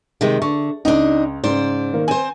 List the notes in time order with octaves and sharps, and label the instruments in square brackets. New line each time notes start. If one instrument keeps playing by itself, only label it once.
[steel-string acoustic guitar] C3 D#3 G#3
[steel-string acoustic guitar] D3 [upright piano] C#6
[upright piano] C#2 [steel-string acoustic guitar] D4 D#4
[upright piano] G#2 C#3 [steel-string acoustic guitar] C5 D5
[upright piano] D#3 A#3
[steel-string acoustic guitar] C4 C5 [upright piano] G#5